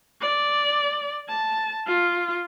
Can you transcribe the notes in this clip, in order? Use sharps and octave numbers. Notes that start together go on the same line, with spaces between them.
D5
A5
F4